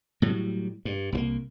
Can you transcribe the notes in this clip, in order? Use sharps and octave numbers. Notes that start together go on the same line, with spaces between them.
A2 F#3 G3
G2
C2 F#3 A#3